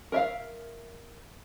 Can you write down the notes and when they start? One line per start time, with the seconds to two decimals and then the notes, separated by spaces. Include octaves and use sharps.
0.12 A#4 E5 F5